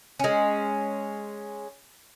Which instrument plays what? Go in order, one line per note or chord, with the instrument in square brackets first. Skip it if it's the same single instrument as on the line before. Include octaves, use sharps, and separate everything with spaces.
[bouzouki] G#3 C#4